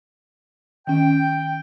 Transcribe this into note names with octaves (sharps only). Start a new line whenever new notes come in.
D#3 C#4 G5